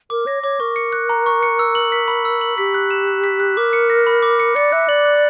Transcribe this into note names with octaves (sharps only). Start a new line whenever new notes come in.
A#4 D6
C#5 A#6
C#5 D6
A#4 C#6
C#7
F#6
A#5
C#6
C#7
E6
F#7
B6
B5
E6
F#7
G4 B6
F#6
E7
F#6
B6
F#6
A#4 D6
C#7
A#6
B5
D6
C#7
D5 C#7
E5 F#6
D5 F#7
F#6